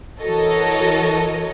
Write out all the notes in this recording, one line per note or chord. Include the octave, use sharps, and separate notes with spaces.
E3 F#4 A4 A#4 C#5 D#5